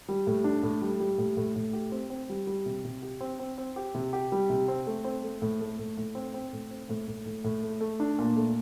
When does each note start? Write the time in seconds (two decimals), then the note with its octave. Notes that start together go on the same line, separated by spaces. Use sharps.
0.09 G3
0.27 A2
0.44 D4
0.63 A2
0.82 G3
1.00 G3
1.18 A2
1.37 A2
1.56 A2
1.73 G4
1.92 C4
2.10 C4
2.29 G3
2.47 G3
2.66 C3
2.85 C3
3.02 G4
3.21 C4
3.39 C4
3.58 C4
3.76 G4
3.95 C3
4.13 G4
4.32 G3
4.50 C3
4.68 C4
4.87 A3
5.04 C4
5.23 A3
5.42 A2
5.61 A3
5.79 A2
5.97 A2
6.15 C4
6.34 C4
6.53 A2
6.71 C4
6.89 A2
7.07 A2
7.26 A2
7.44 A2
7.63 A3
7.81 A3
8.00 D4
8.19 A#2
8.36 A3